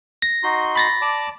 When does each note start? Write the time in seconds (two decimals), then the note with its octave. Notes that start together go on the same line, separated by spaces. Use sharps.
0.22 A#6
0.43 D#4 F#4 C6
0.76 B5 A6 A#6
1.02 D5 A5 D6